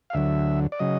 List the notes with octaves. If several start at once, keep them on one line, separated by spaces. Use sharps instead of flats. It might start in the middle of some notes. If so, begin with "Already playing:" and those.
F5
D2 D3 F#3 E5
D5
C#3 F#3 D#5